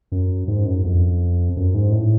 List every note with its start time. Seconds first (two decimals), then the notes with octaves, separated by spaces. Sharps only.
0.12 F#2
0.48 G#2
0.66 F#2
0.84 F2
1.57 F#2
1.75 G#2
1.92 A2